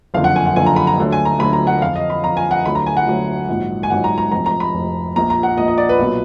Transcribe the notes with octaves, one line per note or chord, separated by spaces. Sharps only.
F#1 F2 D3 F3 F5
F#5
G#5
F#5
F#1 F2 D3 F3 G#5
A#5
B5
A#5
D2 D3 F#3
G#5
A#5
D2 D3 F#3 B5
A#5
F#5
F2 F3 F5
D#5
B5
F2 F3 A#5
G#5
F#5
D2 D3 F#3 B5
A#5
G#5
F#5
D2 D3 F#3
A#1 G#2 F#3
G#5
A#1 G#2 F#3 F#5
A#5
A#5
F1 F2 F3 A#5
A#5
B5
F1 F2 F3
A#1 A#2 F3 A#5
A#5
F#5
A#1 A#2 F3 D#5
D#5
D5
B4
B1 A#2 F#3